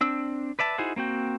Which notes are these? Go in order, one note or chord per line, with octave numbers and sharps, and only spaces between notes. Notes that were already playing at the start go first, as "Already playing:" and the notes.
C4 D4 E6
B4 D5 E5 A5
D#4 E4 F#4 G#4 C5
A#3 C4 F#4 G5